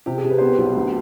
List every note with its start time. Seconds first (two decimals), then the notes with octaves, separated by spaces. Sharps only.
0.06 C3 G4
0.18 G#4
0.24 C3
0.30 B4
0.38 B3 C5
0.48 B4
0.58 B1
0.75 D2